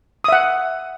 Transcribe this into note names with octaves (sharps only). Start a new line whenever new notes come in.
E5 F#5 D#6